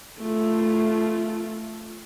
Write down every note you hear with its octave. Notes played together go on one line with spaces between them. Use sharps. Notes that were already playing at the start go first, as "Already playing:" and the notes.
A3 F4